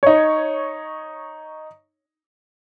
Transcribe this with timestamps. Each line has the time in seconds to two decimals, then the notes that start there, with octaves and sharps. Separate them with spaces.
0.03 D#4 C#5